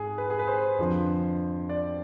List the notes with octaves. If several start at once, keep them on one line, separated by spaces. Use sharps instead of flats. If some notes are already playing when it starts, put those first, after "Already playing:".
Already playing: G#2 G#4
B4
G#4
B4
C5
F2 D3 F3
D5